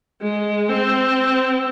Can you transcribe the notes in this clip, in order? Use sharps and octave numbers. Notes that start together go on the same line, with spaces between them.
G#3
C4